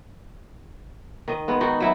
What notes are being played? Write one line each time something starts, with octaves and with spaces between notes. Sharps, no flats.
D#3 D#5
G#3 B3
D#3 D#4 F#4 G5
F#3 E4 E5